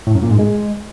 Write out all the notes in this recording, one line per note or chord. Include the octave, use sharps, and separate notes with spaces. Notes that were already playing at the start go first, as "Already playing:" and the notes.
A2
F#2
A#2
G#2
G#3